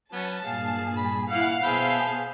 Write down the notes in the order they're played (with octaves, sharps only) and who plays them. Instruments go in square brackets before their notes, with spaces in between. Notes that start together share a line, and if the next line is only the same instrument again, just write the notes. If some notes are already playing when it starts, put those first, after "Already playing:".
[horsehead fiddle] F#3 [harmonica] B3 C#4 [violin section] A5
[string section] G2 A#2 [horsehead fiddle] G#4 [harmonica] F5
[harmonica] B5
[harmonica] E3 F6 [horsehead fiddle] E4 F#5 [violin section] F5
[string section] B2 C5 A5 [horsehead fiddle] B3 G#4 [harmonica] E5 G5 B5